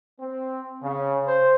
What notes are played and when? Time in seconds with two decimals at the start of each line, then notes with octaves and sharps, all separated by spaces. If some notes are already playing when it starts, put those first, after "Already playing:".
0.20 C4
0.82 C#3
1.26 C5